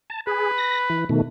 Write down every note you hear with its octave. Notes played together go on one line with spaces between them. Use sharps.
A5
G#4 B4
A#6
E3
B2 D#3 A3